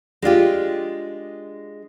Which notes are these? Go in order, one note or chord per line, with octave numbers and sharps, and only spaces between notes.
G#3 D4 F4 G4